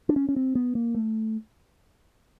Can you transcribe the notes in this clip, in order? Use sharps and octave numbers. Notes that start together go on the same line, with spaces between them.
D4
C#4
C#4
C4
B3
A#3
A3